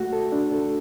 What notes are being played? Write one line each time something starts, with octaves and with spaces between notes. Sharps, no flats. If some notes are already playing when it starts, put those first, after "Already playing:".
Already playing: A3 F#4
A4
D4
A4